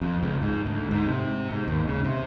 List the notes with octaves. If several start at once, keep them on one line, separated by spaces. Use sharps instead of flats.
F2
C#2
G#2
D2
G#2
C3
G#2
D#2
C#3
C3